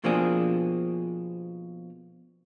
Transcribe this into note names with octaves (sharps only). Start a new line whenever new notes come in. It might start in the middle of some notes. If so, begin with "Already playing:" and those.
B2 F3 A#3 C4 D4 G#4